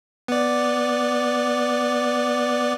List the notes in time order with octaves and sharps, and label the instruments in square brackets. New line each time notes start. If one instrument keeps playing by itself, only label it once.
[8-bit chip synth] B3 D5